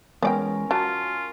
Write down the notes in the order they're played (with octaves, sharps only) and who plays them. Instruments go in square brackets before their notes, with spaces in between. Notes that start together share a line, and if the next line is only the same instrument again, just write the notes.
[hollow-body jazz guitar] E2 G#3 [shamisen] B3 D5 G5 [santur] C#4 A#4
[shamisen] F#3 [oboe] F4 [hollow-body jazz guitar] A5